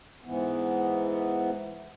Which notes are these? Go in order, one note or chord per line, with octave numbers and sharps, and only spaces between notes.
G#2 E3 B3